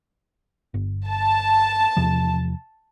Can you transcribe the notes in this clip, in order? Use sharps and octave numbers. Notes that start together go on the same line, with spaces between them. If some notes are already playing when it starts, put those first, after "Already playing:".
G1
A5
E2 C3 F3